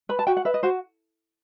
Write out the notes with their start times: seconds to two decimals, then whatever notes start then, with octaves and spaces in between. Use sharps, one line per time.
0.09 B4 B5
0.19 A5
0.27 F#4 G5
0.37 F#5
0.45 B4 E5
0.54 D#5
0.63 F#4 C5